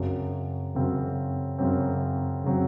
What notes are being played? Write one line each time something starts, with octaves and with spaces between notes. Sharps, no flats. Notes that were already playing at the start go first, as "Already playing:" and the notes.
Already playing: F#2 C#3 F#3 C4
F#2 C#3 F#3 C4
F#2 C#3 F#3 C4
C#3 F#3 C4